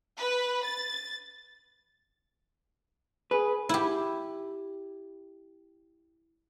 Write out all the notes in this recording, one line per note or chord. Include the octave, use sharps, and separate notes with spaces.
B4
A6
G#4 B4
E4 G4